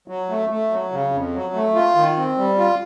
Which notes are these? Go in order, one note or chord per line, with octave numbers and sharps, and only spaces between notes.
F#3
A3
A3
F#3
C#3
F2
F#3
A3
F4
D#3
C4
G3
F4